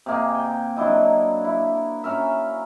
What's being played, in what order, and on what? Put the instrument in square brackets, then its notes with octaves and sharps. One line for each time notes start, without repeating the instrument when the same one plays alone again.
[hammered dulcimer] C3 A#3 G#4
G5
F#3 D4 E4 D#5
E4
C#4 F#4 A#4 E5